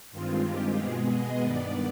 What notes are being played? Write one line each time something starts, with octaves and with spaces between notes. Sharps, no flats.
G2 D#3 G#3 C4 F4
G4
B2 G#3 B3 G#4
D#5
G2 D#3 B3 D5